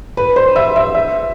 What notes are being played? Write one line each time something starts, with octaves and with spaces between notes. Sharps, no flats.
B4
C5
E5
E5
E5